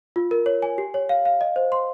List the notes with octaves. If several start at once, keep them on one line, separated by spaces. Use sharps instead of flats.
F4
A#4
C#5
G#5
G4
C#5
F5
F5
D#5
C5
C6